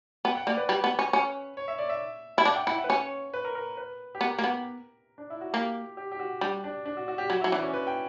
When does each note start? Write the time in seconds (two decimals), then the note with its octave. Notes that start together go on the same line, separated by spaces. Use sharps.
0.25 B3 G5
0.35 F#5
0.47 A#3 D5
0.57 B4
0.69 G3
0.84 B3
0.99 C#4
1.13 C#4
1.57 C#5
1.68 E5
1.78 D5
1.89 E5
2.37 E4 E5
2.45 D4 F#5
2.56 G5
2.67 E4 F#5
2.78 E5
2.84 B4
2.89 C#4 C#5
3.34 B4
3.45 A#4
3.55 A#4
3.77 B4
4.15 G4
4.21 B3 A#4
4.39 A#3
4.44 B3
5.18 D4
5.30 E4
5.41 F#4
5.53 A#3 G4
5.97 G4
6.12 G4
6.19 F#4
6.41 G3 D4
6.64 D4
6.86 D4
6.97 F#4
7.08 F#4
7.18 G4
7.30 F#3 F#4
7.41 F#3 E4
7.52 E3 D4
7.62 C#4
7.74 B4
7.87 G5